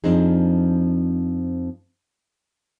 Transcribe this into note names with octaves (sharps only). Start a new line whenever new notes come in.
F2 F3 C4 D4 D#4 G#4